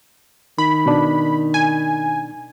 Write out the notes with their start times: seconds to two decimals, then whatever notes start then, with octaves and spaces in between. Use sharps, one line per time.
0.58 D#3 B5
0.86 B2 D4
1.54 G#5